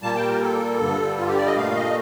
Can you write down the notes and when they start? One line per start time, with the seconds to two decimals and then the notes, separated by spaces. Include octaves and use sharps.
0.02 A#2 G3 A#3 A5
0.15 G5
0.28 A#4
0.41 A4
0.79 G2 D3 G3
1.18 F4
1.28 G4
1.37 D5
1.47 D#5
1.56 A#2 A3 F5
1.76 D#5